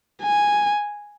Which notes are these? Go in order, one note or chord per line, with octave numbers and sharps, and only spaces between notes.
G#5